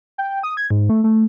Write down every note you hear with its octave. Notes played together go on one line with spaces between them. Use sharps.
G5
D#6
G#6
G#2
A3
A3